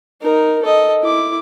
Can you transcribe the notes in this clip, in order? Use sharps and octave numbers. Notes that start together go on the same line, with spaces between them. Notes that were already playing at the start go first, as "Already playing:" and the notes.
D#4 A#4
A4 D#5
E4 D6